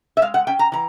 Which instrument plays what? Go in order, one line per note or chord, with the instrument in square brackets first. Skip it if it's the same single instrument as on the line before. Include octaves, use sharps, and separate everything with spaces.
[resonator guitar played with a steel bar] E5
G#3 F5
F#5
C#4 G5
A#5
E3 A#5